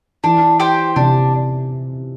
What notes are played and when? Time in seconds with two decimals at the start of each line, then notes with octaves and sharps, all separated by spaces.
0.24 E3 D4
0.60 G4 C5 G5
0.96 C3 D4